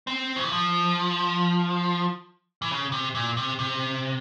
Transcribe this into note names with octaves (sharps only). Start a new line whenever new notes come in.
C4
C#3
E3
F3
E3
C#3
C3
A#2
C3
C3